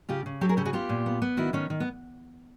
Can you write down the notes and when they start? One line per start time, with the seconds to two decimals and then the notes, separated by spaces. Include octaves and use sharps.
0.09 C#3 F4 G4
0.26 C#3
0.41 F#3 G4 A4
0.49 G#4 A#4
0.57 C#3 G4 A4
0.65 F#4 G#4
0.73 B3 F4 G4
0.89 A#2
1.06 B3
1.22 B3
1.37 D#3 E4 F#4
1.53 D#3 B3 C#4
1.70 D#3
1.80 B3